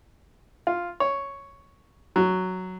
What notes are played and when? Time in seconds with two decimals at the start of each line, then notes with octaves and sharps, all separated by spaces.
0.67 F4
1.00 C#5
2.16 F#3